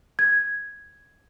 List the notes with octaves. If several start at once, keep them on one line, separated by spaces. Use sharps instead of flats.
G#6